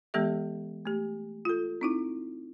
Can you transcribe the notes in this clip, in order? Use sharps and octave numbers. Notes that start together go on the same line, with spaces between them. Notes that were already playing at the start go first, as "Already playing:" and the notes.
E3 G#3 B3 G4 A4 E5
A3 G4
F4 A4
C4 D#4 E4